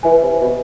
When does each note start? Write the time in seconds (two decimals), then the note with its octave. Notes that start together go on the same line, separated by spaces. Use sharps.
0.03 E3 B4 E5 G#5
0.22 C3
0.41 B2